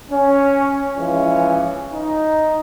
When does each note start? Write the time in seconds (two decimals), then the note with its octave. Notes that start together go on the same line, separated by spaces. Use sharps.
0.10 C#4
0.98 E3 F3 G#3 C#4
1.92 D#4